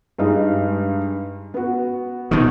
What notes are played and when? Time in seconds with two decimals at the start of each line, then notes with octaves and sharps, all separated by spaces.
0.19 G2 G#3 D#4
1.54 B3 F#4
2.31 B2 D#3